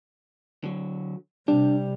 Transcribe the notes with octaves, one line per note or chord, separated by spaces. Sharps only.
D3 F#3
C3 G3 D4